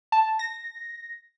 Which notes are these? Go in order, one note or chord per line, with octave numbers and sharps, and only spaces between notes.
A5
A#6